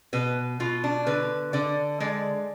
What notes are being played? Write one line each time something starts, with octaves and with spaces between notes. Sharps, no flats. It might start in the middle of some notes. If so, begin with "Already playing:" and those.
B2 B4
B2 F4
D4
D3 B4
D3 D5
G#3 D5